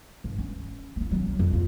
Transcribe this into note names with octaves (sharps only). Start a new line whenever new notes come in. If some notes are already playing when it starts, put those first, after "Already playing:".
G2
C#4
A#3 D#4
F#3 C#4
F2
E2 F4